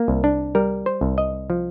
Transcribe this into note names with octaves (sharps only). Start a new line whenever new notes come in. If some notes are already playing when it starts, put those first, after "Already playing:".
Already playing: A#3
C2
D4
G3 A#4
C5
C2
D#5
F3